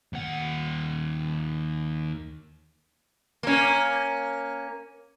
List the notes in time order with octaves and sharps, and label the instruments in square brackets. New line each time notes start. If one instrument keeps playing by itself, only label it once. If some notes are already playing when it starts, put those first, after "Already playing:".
[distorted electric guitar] D#2 F#5
[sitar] A#3 C#4